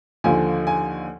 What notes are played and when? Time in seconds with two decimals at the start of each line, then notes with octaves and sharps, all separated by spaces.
0.24 D#2 D3 F3 G#5
0.67 G#5